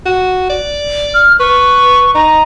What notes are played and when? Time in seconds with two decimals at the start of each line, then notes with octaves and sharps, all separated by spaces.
0.05 F#4
0.49 D5
1.14 F6
1.40 B4 C#6
2.15 D#4 A#5